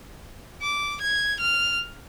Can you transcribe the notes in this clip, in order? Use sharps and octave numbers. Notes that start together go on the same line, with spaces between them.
D6
G#6
F6